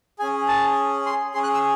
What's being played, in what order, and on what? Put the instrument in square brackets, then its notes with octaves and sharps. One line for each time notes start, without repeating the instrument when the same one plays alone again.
[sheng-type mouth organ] C#4 G#4 G#5
A5
C6
C#4 G#4 C6
F#6
E6